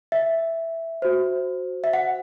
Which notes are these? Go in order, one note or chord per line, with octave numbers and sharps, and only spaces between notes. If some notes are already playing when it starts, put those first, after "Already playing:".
E5
F#4 C5
E5
F#5